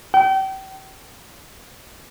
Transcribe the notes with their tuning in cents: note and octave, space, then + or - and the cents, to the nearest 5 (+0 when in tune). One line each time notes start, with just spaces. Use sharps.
G5 -35